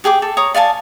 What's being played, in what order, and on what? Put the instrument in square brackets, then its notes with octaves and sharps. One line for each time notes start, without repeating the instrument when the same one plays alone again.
[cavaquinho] G4 G#4 G5 D6
A4
C#5 A#5 D#6
D5 F5 G#5 A5